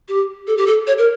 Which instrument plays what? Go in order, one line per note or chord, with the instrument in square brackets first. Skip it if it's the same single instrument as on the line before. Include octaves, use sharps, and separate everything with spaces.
[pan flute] G4
A4
G4
A4
C#5
A#4